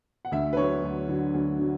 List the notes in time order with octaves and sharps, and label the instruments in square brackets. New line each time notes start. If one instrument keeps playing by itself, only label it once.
[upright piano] F#5
D2 E5
B4
D3 F#3 C#5
D2
D3 F#3
D2
D3 F#3